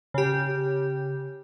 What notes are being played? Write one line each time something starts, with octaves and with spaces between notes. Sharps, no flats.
C#3 G4